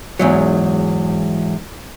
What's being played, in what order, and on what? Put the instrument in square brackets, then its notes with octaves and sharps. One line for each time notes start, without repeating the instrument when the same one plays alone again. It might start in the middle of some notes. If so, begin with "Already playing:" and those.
[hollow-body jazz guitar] E2 G#2 F#3